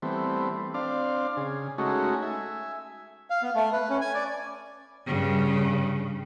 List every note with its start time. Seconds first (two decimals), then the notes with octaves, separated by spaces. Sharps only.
0.02 E3 G3 A3 B3 C4
0.74 C4 D4 D5 F5
1.37 C#3 G#4
1.78 G#3 A3 C#4 D#4 F#4
2.22 E5 G#5
3.30 F5
3.42 B3
3.55 A3
3.73 B4
3.89 C#4
4.01 G#5
4.14 D5
5.07 G2 C#3